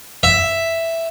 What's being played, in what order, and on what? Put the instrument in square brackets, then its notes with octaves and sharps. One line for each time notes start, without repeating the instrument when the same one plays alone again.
[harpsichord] E5